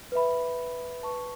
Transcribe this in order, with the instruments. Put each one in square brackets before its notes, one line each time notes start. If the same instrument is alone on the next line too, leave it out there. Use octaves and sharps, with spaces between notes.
[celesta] B4 E5 B5
B4 A5 C#6